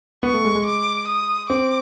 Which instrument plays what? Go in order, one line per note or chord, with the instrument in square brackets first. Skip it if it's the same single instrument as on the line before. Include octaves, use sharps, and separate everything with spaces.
[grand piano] B3 [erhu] C#6
[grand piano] A3
G#3
G#3
[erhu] D6
D#6
[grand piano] C4 [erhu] D6